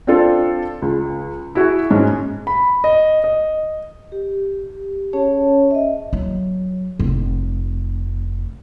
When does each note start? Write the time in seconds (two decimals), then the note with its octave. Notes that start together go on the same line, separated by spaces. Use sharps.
0.07 C4 D4 F4 A4
0.82 C#2
1.55 E4 F#4 G#4
1.90 G#2 G#3 C#4
2.47 B5
2.84 D#5
3.24 D#5
4.12 G4
5.13 C#4 G#4 C#5 A5
5.71 D#5 E5
6.13 F#3
6.99 F1